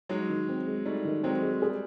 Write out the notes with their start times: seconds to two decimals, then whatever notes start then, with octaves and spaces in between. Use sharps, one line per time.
0.09 F#3 G#3 D#4
0.30 D#3
0.48 C4
0.67 G#3
0.86 G3 A3 D#4
1.05 D#3
1.23 F#3 G#3 C4
1.42 G#3
1.62 G3 G#4